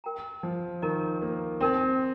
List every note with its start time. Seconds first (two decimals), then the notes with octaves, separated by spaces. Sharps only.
0.04 A#4 G5 A#5
0.43 F3
0.82 D#3 A#4 D#5 A#5
1.22 A#3
1.61 C4 D#4 A#4 G5